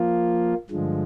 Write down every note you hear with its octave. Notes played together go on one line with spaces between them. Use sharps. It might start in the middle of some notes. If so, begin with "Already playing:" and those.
Already playing: F3 A#3 F4
G2 D3 F3 G#3